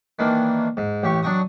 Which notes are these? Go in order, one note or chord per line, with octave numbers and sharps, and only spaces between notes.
D#3 E3 A#3 D4
G#2
A1 G4 C#6
F#3 D4 D#5 G5 C#6 D#6